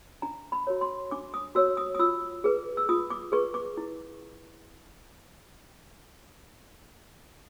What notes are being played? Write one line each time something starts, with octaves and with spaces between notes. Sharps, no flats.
D4 A#5
B5
F#4 A#4 C#5
C6
D4 D6
D#6
F#4 A#4 C#5 E6
D#6
D#6
F4 E6
G#4 B4
E6
F4 D#6
D6
G#4 B4 C#6
D6
E4